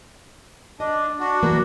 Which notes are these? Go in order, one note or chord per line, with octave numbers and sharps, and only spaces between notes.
D4 D#5
D4 F#4
E3 F#3 A#3